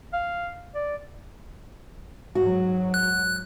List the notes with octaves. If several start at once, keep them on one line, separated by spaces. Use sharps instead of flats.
F5
D5
G#2 F#3 F#4
F#6